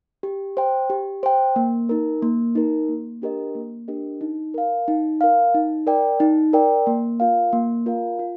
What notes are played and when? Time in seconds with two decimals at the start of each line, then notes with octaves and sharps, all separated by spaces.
0.23 G4
0.57 C5 G5
0.90 G4
1.23 C5 G5
1.56 A#3
1.89 D#4 A#4
2.22 A#3
2.55 D#4 A#4
2.89 A#3
3.22 D4 G4 A#4 D#5
3.55 A#3
3.88 D4 G4 A#4 D#5
4.21 D#4
4.54 A#4 F5
4.88 D#4
5.21 A#4 F5
5.54 D#4
5.87 A#4 D5 G5
6.20 D#4
6.53 A#4 D5 G5
6.87 A#3
7.20 F4 A#4 F5
7.53 A#3
7.86 F4 A#4 F5
8.19 F4